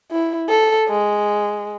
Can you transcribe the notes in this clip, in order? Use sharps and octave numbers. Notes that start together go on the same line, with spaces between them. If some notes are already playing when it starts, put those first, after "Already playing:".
E4
A4
G#3